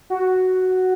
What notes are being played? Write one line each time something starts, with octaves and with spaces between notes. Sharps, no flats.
F#4